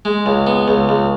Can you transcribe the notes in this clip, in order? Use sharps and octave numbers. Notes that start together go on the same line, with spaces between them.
G#3
C#2
B3
C#2
C#2